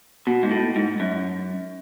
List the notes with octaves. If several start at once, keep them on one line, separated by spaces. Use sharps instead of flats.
B2
G#2
A2
G#2
F#2